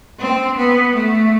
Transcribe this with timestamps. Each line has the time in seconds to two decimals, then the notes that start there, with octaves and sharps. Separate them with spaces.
0.19 C4
0.57 B3
0.95 A3